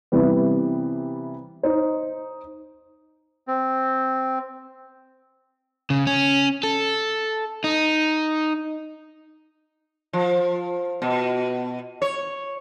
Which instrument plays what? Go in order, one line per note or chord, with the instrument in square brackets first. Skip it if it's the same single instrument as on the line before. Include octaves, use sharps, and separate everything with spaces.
[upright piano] C3 E3 G3 B3
D#4 C5
[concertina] C4
[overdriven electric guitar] C#3
C#4
A4
D#4
[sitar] F3
B2
C#5